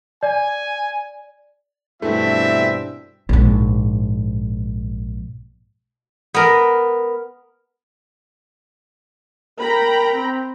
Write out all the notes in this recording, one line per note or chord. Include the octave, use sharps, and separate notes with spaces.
D5 G#5
G2 B2 E3 A3 C4 D4 E5
A#1 G#2
B3 A#4
A#4 G5 A#5 B5
C4